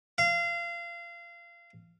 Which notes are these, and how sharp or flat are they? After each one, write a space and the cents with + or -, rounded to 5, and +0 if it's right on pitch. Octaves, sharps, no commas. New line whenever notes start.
F5 -25